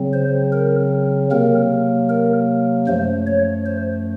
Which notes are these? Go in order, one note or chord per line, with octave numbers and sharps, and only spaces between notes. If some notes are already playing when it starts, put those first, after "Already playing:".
Already playing: C#3 F#3 C4
C5
A#4
C3 F#3 A#3 A#4
A#4
F#2 F3 A3 C5
C#5
C5